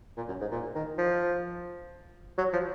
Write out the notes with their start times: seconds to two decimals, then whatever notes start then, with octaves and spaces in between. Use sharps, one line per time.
0.17 A#2
0.28 F#2
0.41 G#2
0.52 A#2
0.75 D#3
0.98 F3
2.38 F#3
2.53 F3